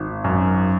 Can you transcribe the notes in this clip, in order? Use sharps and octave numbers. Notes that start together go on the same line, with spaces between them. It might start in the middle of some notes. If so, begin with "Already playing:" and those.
Already playing: G#1
F#2